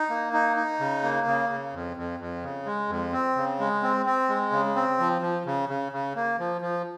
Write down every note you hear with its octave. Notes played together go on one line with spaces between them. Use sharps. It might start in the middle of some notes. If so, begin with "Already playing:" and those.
Already playing: D#4
A#3
D#4
D#4
C#3
A#3
C#3
C#3
F2
F2
F2
C#3
G#3
F2
C4
C#3
G#3
C4
C4
G#3
C#3
C4
F3
F3
C#3
C#3
C#3
A#3
F3
F3